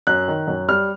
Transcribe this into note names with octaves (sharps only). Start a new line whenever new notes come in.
F#2 F#6
D#3
F#2
G3 F6